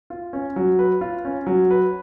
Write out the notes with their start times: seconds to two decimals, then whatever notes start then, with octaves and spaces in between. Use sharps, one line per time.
0.10 F4
0.33 C#4
0.56 F#3
0.79 B4
1.01 F4
1.25 C#4
1.47 F#3
1.71 B4